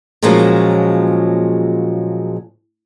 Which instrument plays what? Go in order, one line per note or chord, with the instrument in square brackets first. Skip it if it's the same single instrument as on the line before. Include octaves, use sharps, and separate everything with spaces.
[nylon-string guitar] A#2 C#3 F3 F#3 G#3 A#3